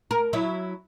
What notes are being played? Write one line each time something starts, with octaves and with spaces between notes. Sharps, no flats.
A#4
F#3 E4